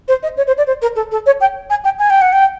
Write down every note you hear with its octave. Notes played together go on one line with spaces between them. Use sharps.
C5
D#5
C#5
C5
D5
C5
A#4
A4
A4
C#5
G5
G#5
G5
G#5
G5
F#5
G5